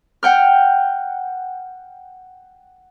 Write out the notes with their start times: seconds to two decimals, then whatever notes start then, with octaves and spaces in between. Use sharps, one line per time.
0.23 F#5 G5 F6